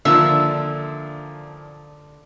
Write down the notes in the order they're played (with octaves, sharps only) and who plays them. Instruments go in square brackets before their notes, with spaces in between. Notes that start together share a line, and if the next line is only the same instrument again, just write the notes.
[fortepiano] A#2 D#3 F3 [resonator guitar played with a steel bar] D3 [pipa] E5